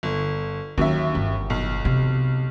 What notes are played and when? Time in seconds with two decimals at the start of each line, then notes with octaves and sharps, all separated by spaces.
0.03 G1
0.78 D#2 F#3 C#4 E5
1.15 G1
1.50 B1
1.85 C3